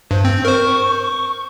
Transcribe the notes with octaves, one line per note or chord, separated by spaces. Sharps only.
G2 C5
C4
A#4 C5 C#6